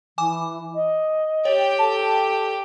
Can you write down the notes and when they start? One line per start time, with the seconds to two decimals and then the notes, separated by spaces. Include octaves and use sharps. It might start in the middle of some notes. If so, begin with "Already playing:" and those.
0.18 E3 G#5 D6
0.75 D#5
1.45 G4 C#5 G5
1.79 A4 A5